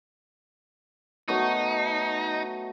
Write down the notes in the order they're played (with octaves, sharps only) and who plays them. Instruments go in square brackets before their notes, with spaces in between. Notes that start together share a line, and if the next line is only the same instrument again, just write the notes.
[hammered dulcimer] F#3 A3 B3 [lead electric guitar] D#4